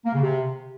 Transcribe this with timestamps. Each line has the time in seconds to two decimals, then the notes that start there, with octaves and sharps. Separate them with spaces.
0.06 A#3
0.14 C#3
0.22 C3